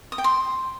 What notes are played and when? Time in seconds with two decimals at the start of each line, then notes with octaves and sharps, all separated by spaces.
0.12 D#6
0.18 G5
0.24 C6